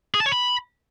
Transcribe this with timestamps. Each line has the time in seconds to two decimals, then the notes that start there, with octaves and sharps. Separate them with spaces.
0.15 G#4
0.20 A5
0.26 C#5
0.32 B5